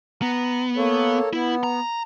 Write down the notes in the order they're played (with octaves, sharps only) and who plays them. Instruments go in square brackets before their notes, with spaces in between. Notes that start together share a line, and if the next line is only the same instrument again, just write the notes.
[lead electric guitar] B3 [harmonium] A#5
[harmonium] A#3 A4 C#5
[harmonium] B3 [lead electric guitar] E4
[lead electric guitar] A#5